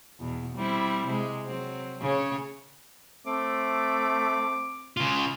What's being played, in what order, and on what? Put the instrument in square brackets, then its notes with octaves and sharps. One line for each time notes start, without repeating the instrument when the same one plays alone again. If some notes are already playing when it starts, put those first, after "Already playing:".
[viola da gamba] E2 B2
G3 C4 E4
C3 G#3
F#3 C4
C#3 C#4 C#5
[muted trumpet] A3 [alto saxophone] C4 [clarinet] D6
[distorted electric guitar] C#3 F4